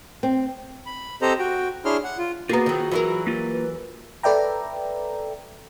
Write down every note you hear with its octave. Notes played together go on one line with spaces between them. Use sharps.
C4
B5
C4 G4 A4 C5 D#5 A#5
F#4 G5
D4 E4 G#4 C#5 C6 F6
F#5
F4
A#3 B3 F4 F#4 G#4 A#5
D#3 F#3
E3 F#3 A#4
A#3 F4 G4
B4
A4 B4 D5 E5 G5 A#5